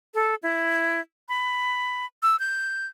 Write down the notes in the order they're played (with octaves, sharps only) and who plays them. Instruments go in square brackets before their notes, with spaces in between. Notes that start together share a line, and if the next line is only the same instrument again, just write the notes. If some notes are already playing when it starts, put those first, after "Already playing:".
[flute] A4
E4
B5
E6
G6